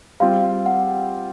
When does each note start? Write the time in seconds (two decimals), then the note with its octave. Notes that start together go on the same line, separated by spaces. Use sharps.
0.20 G3 C4 F4 F5
0.66 F#5